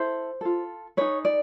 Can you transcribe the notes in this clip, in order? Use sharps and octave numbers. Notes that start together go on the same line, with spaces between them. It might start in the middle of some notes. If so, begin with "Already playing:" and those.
Already playing: E4 A4 C5
F4 A4
D#4 G#4 B4 C#5
D5